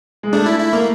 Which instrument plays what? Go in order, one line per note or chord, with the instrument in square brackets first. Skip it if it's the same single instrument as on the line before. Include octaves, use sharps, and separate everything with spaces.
[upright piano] G#3
[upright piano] A3 [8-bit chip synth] D4
[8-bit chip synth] E4
E4
A#3